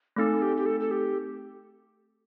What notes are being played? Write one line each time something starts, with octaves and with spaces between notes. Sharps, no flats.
A3 C4 D#4 A4
G4
G4
A4
A4
G4